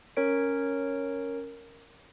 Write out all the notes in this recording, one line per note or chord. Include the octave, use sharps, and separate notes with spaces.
C#4 A#4 C#5 D7